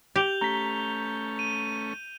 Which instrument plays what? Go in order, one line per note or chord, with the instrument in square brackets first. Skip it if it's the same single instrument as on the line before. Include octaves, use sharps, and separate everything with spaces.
[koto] G4 [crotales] G6 F7 G7
[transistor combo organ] A3 C#4 [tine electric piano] A#5 B6
[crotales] D#7